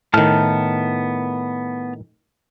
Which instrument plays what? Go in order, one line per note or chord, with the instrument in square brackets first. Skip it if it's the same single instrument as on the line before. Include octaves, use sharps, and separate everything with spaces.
[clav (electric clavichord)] A2 D#3 [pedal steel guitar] B3 A5 F6